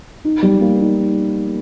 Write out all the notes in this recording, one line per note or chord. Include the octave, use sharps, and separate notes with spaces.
D#4
G3
A#3
D#4